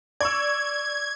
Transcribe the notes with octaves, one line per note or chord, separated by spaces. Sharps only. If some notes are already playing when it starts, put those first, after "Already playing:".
D5 C#6 E6 G#6